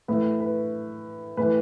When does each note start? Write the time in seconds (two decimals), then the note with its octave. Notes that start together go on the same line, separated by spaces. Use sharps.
0.08 A2 E3 B4
0.40 B4
1.37 A2 E3 B4